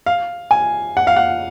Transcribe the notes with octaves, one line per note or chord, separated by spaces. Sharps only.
F5
G#5
F#5
F5
F#5